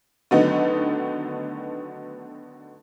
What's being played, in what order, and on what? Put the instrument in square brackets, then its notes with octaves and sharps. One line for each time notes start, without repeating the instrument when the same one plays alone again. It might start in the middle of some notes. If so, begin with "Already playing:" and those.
[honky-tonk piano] D3 D#3 F#3 A3 B3 D#4